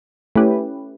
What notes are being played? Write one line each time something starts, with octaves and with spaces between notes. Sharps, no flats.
A3 C#4 E4 G4 B4